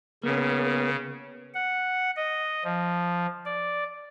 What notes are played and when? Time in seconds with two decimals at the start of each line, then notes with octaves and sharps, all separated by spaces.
0.24 C#3 A#3 B3 C#4
1.54 F#5
2.16 D#5
2.64 F3
3.45 D5